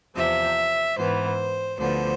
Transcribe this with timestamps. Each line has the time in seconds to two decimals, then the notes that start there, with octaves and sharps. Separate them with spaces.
0.16 E2 C3 F3 E5
0.97 G#2 E3 B3 C5
1.79 D2 D3 F3 B3 C5